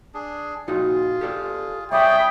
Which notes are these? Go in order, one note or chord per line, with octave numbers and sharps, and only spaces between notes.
D4 G#4
A#2 D#4 F4 F#4 G#4
G4 A4 D5
C2 G#4 C#5 D5 E5 G5 B5 D#6